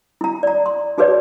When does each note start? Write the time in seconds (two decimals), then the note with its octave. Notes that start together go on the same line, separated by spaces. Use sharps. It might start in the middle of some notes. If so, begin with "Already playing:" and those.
0.21 E4 A#5
0.43 D5 A#5
0.66 C6
0.98 D#4 F#4 G#4 B4 C#5 D5